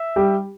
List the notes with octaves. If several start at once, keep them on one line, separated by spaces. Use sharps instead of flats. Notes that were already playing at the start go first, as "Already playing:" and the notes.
Already playing: E5
G3 G4